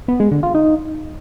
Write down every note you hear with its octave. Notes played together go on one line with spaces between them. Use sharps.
B3
G#3
D3
F4
D#4